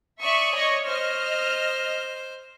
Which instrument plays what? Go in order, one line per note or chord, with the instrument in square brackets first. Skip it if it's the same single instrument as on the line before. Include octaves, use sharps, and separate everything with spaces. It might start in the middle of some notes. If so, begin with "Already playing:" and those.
[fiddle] D5 D#6 [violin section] E5 C#6
[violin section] C#5 D#5 C#6
[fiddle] C5 [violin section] D#5 F6